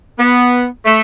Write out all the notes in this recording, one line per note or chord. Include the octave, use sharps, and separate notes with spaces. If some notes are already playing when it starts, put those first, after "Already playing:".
B3
A3